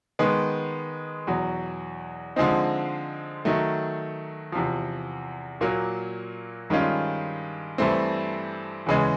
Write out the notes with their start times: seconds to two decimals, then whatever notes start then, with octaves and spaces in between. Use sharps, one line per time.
0.19 D#3 G#3 B3
1.27 E2 B2 F#3
2.36 D3 F3 G#3 C4 D#4
3.45 D#3 F#3 A3
4.52 E2 C3 F3
5.61 A#2 F#3 A#3
6.70 G2 D#3 G#3 C#4 F4
7.78 G2 E3 A3 C4
8.86 E2 C#3 E3 G#3